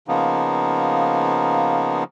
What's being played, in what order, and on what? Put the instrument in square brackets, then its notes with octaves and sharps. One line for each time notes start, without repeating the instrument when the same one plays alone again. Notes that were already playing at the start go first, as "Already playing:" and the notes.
[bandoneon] C#3 F3 A#3 B3 D#4